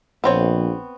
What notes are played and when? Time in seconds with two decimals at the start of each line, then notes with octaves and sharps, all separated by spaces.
0.24 A#1 B3 C4 C#5